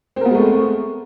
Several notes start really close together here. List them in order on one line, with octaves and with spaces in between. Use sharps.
C4 A#4 B3 G#3 A3